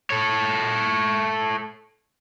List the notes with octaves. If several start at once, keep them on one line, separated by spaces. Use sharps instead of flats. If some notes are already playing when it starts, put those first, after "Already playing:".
A4 C#5